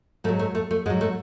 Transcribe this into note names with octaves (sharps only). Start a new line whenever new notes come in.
G#2 F#3 A3
A3
A3
A3
G#2 F#3 G#3
A3